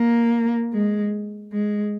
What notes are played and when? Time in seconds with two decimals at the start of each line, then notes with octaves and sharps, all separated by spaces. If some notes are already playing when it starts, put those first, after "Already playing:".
Already playing: A#3
0.73 G#3
1.53 G#3